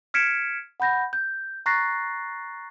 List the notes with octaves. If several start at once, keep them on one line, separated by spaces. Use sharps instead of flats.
F6 G#6 B6 C#7 D7 E7
F#5 B5 G6 A#6
G6
A#5 C#6 F#6 A6 A#6 C7